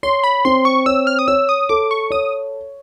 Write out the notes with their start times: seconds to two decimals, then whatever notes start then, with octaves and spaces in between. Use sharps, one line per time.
0.03 C#5 C6
0.24 B5
0.45 C4 C6
0.65 C#6
0.86 C#5 E6
1.07 F6
1.19 D#6
1.28 C#5 E6
1.49 D#6
1.69 A4 D6
1.91 C#6
2.11 C#5 D#6